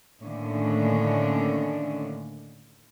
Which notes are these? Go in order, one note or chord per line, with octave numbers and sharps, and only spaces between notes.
A2 D3 D#3 A#3 C#4 D4